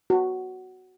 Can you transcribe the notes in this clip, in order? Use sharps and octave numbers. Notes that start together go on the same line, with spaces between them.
F#4